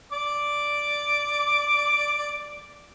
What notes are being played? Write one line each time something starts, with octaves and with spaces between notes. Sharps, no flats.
D5 D6